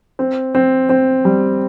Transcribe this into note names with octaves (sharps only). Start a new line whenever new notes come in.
C4
C4
C4
G3